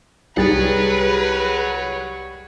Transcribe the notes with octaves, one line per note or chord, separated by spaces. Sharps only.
C2 G3 G#4 B4 C#5 F#5 A6